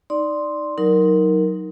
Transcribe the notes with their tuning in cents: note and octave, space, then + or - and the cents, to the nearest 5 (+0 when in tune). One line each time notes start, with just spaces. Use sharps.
D#4 +0 D5 +0 C6 +0
F#3 +0 D#4 +15 A#4 +0